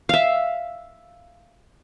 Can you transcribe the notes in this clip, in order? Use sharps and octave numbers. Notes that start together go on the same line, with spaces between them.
E5 F5